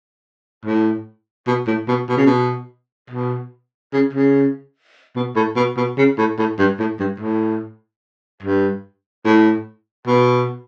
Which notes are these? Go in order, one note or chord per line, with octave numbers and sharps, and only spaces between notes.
A2
B2
A2
B2
B2
C#3
B2
B2
C#3
C#3
B2
A2
B2
B2
C#3
A2
A2
G2
A2
G2
A2
G2
A2
B2